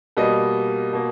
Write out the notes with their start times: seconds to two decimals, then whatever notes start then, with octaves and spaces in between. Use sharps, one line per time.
0.17 B2 G3 A#3 D#5
0.93 B2 A#3